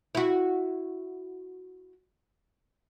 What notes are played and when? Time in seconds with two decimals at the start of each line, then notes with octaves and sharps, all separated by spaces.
0.15 E4 F#4